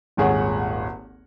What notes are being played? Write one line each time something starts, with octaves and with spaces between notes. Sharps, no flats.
D#1 G#1 G#4 C#5 F#5